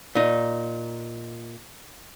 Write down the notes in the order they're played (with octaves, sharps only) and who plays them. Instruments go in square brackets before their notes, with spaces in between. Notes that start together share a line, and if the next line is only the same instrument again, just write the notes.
[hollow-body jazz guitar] A#2 D#4